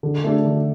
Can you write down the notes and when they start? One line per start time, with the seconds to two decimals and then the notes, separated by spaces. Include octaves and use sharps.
0.03 D3
0.24 A3 D4 A4
0.45 D3